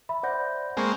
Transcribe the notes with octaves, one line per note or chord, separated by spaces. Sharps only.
E5 B5
C5 D5 F#5 G6 A#6
G#3 A#3 C4 G#5 C#6